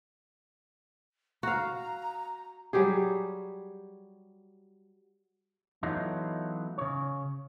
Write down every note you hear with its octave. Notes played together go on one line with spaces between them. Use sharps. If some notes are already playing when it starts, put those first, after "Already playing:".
F#4 F5 A#5
F#3 G3 G4 G#4
E3 F#3 A3 B3 D#4 F4
C#3 C#5